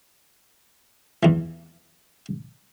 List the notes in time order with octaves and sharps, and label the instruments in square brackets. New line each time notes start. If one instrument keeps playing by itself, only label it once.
[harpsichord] E2 E3